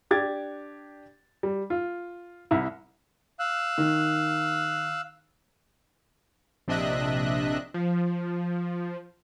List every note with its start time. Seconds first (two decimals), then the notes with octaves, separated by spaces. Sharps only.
0.11 D4 G4 D6 G#6 A6
1.43 G3
1.70 F4
2.51 C2 E4
3.40 F5 E6 F#6
3.78 D#3 D#4
6.68 A#1 C3 D4 D#5 E5 F#6
7.74 F3